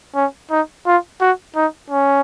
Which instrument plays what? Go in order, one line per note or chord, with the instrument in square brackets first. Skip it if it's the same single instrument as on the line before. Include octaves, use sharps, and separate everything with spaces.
[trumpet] C#4
D#4
F4
F#4
D#4
C#4